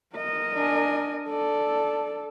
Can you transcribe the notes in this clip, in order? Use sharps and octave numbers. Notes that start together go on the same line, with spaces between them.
A#4 D#5
D4 G#5
A4 D5